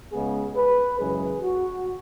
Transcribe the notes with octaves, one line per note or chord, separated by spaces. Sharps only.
C#2 C#3 G#3 B3 G#4
B4
F#2 C#3 E3 G#3 G#4
F#4